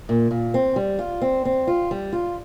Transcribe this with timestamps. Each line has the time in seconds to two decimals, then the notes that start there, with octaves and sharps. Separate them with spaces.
0.09 A#2
0.31 A#2
0.54 C4
0.76 G3
0.99 F4
1.21 C4
1.45 C4
1.67 F4
1.91 G3
2.12 F4